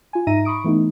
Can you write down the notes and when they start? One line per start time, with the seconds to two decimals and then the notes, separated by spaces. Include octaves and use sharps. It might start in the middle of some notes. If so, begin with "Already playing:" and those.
0.13 F4 G#5
0.27 G#2 D#4 E5 A#5 A#6 D#7
0.45 B5 C#6 D#6 D7
0.64 E3 A3 B3 D#4